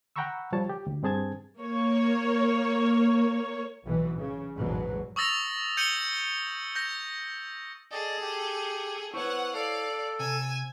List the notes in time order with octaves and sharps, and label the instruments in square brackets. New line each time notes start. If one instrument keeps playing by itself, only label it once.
[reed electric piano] F#5 G5 A#5 B5 C#6 E6
C#2 F3 G3 C#5 A5
G4
D2
G2 C4 G#4 A5 G#6
[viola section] A#3 C#5
[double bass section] B1 B2 E3
C#3
A1 E2 G#2 B2 F#3
[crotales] C#6 D#6 E6 A6 A#6 F7
G6 C#7 D#7 F#7 G7
G6 A#6
[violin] G#4 A4 [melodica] D5 D#5
[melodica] G4
[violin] B3 F#5 [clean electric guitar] E4 C5 C#5 [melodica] C#6
[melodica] A4 [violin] D5 F5
[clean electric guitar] C3 [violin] G#5 E6